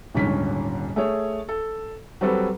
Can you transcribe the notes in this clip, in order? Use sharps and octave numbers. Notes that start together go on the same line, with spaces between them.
D#1 G#2 D3 C#4 B6
A3 G#4 C#5
A4
F#3 G3 C4 A4 B4